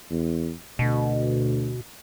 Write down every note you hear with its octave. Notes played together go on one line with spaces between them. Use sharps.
E2
D2 B2